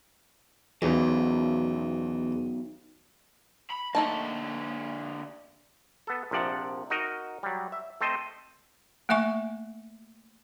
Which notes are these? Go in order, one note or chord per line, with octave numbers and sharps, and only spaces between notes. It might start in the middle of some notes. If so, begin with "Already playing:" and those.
E2 B2 D#3 F#3
B5
D3 A3 A#3 D#4 A5
B3 A4
A#1 C3 F3 D5 F#5
D#4 F#4 A#4 D#5
F#3 G3
E5
A3 C4 A4 C5 D#5
A3 A#3 E5 G#5 C#6